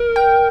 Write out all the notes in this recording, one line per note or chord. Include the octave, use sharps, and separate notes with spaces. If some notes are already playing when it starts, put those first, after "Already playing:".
Already playing: A#4
G5